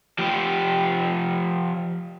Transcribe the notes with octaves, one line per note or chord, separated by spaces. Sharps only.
F3 G4